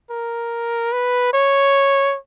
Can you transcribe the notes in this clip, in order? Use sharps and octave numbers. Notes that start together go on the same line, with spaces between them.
A#4
B4
C#5